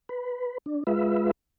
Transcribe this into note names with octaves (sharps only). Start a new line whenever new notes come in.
B4
D4
G#3 F4 B4 E5